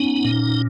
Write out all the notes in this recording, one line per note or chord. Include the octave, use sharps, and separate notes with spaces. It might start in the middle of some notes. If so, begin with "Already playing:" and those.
Already playing: B3 C#4 D#4
A#2